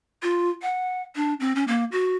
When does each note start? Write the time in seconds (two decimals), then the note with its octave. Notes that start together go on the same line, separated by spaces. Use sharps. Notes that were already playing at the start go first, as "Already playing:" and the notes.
0.23 F4
0.62 F#5
1.16 D4
1.40 C4
1.56 C#4
1.68 A#3
1.92 F#4